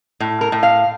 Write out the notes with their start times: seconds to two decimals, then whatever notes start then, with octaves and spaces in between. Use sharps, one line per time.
0.20 A2
0.41 A#4
0.52 A2
0.63 F5